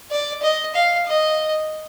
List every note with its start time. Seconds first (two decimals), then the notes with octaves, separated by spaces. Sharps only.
0.11 D5
0.42 D#5
0.74 F5
1.06 D#5